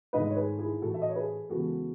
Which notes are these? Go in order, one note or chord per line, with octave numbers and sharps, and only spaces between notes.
G#2 D#3 A3 B4 D#5
C#5
G#4 B4
E4 G#4
A2 E3 A3 F#4 A4
E5
D#5
C#5
G#4 B4
E2 C#3 G#3 B3 F#4 A4